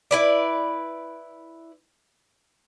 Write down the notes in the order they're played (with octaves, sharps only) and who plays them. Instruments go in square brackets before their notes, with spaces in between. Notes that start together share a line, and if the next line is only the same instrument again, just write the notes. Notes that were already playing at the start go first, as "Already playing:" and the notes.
[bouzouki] E4 B4 D5